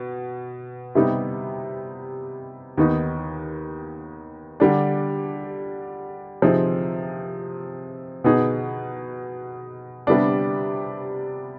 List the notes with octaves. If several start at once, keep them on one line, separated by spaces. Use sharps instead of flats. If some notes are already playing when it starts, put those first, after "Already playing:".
Already playing: B2
C3 G3 B3 D#4
D#2 D#3 B3 D#4
D3 G3 D4
C3 F3 C4 D#4 G#4
B2 B3 D#4 G#4
C3 G3 B3 D4